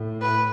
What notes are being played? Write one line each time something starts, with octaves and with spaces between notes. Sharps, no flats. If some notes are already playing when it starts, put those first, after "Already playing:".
Already playing: A2
B4